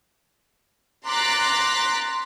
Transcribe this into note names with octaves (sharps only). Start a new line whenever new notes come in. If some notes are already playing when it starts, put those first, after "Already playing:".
A#5 C6 D6 F#6 A6 B6